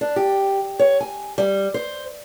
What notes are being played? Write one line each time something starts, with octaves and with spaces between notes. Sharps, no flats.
D4
G4
C#5
G#5
G3
C5